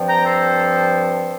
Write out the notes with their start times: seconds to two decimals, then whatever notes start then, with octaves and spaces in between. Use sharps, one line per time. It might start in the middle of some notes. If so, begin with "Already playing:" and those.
Already playing: G2 F3 C4
0.09 G5 A#5
0.26 A4 C5